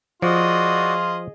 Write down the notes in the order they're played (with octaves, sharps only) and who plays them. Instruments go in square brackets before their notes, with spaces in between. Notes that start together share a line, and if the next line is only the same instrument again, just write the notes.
[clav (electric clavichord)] F3 [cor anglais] F4 [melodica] F#4 D5 [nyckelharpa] G#4 D#5